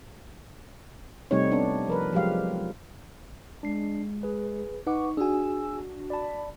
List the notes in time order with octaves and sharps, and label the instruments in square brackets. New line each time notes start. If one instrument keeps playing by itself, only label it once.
[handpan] C3 G3 A3 C4 D#4 C#5
B3 D4
F3 A#4 B4
F3 F#3 G#3 G4 F5
[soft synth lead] G#3 [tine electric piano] D4 C7
[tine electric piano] G#4 B4
[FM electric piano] D#4 [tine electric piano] B4 F#5 D6 [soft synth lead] C#6
[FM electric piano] D4 F#4 [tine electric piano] G#4 G#5 [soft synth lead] E6
[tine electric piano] D5 A5 [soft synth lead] B5